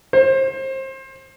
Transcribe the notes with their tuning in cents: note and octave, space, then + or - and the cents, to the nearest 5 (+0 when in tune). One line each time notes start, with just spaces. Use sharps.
C5 +30